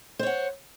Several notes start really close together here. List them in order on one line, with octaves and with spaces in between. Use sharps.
C5 C#5 F#5